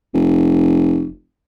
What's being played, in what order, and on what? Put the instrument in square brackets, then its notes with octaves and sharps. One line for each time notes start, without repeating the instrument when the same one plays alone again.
[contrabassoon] F1